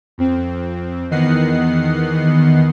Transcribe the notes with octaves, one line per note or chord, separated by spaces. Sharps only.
F2 C4
E2 D#3 B3 D#5 F#5 C7